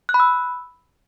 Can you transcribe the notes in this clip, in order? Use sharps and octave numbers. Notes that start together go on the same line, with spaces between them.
F#6
B5
E6